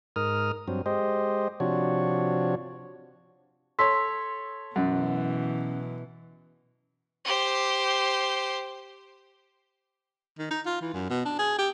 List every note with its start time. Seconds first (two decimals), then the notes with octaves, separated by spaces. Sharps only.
0.16 G#2 A#4 D#6 F6
0.68 G2 F#3 C4
0.86 G#3 G4 C5 D#5
1.60 C3 F3 D4 F#4 C#5
3.79 A4 C#5 C6 E6 B6
4.76 F#2 B2 E3 C#4 F#5
7.25 G4 C5
10.39 D#3
10.51 D#4
10.66 F4
10.82 E3
10.94 F#2
11.10 B2
11.25 D4
11.39 G#4
11.59 G4